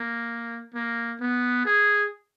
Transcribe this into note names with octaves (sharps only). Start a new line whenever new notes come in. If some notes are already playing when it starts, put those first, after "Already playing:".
Already playing: A#3
A#3
B3
G#4